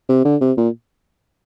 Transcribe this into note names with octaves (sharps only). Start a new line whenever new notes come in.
C3
D3
C3
A#2